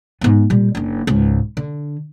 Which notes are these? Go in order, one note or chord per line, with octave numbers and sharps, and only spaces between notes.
G#2 B3
A#2 G3
F#1 D4
C#2 G#2
D3